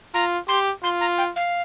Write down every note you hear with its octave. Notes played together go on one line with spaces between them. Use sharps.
F4 A#5
G4 C6
F4 C6
A#5
G5
F5